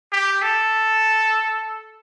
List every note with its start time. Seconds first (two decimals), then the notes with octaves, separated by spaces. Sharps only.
0.12 G4
0.42 A4